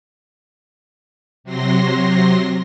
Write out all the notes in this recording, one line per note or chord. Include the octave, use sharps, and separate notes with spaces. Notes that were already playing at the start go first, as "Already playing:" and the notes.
C3 F#3 C6 A#6